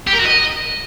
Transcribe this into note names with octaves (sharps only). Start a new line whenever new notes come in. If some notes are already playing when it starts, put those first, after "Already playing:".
G4
A#4
F#4
D#5